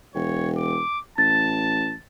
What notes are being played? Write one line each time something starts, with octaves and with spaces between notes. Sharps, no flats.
E1 C#5
D6
A1 A5 A6